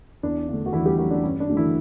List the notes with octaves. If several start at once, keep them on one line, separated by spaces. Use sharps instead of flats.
E2 D4
D3 A3
F#4
E2 E3 E4
G3 G4
D3 F#3 A3 F#4
D4
G2 C#4
D4
D3 F#3 A3
E3 E4